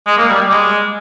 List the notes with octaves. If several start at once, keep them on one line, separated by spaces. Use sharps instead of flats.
G#3
A#3
G3
G3
G#3